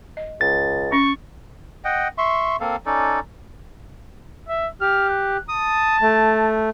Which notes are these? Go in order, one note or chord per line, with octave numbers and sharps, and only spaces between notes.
D#5
C#2 A6
C#4 C#6
D#5 F#5 G5
E5 C6 C#6
A#3 C4 A4 F5
C#4 D#4 A4 D5
E5
G4 F6
F#6
A5 D#6
A3